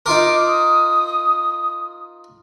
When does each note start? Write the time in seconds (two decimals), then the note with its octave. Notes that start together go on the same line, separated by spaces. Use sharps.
0.06 D#4 F4 A#4 D6
0.46 D#6